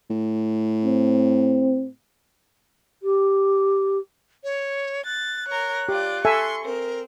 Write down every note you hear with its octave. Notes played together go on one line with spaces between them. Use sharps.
A2
C4
G4
C#5
F#6 A6
A#4 C#5
F4 G4 D5
A4 E5 G#5 C6 C#6
C4 A#4